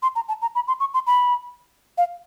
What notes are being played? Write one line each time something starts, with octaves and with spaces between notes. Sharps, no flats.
C6
A#5
A5
A#5
B5
C6
C#6
C6
B5
F5